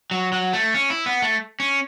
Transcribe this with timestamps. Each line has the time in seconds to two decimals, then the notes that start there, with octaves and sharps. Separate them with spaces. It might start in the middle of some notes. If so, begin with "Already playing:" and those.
0.11 F#3
0.32 F#3
0.53 A3
0.74 C#4
0.90 E4
1.06 B3
1.22 A3
1.60 C#4